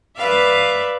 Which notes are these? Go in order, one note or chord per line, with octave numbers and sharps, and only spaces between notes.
B4 D5 E5 F5